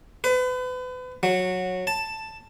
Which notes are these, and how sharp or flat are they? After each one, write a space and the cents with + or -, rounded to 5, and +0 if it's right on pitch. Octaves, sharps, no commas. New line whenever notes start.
B4 +35
F#3 -15
A5 +5